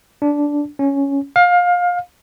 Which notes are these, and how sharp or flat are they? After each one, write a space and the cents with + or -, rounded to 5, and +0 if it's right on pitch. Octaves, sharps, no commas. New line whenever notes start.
D4 -10
C#4 +5
F5 +25